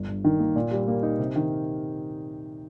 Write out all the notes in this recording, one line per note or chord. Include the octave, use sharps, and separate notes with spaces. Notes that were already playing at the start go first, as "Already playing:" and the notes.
Already playing: G1
G2
D#3
A#3
A#2
G3
A#3
D#4
C3
D#3